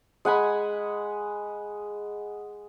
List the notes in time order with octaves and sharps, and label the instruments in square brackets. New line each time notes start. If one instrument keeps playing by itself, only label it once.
[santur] G#3 F#5 G#5 B5